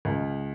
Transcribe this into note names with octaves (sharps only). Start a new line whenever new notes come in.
C#2